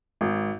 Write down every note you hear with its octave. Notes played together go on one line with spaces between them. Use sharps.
G#1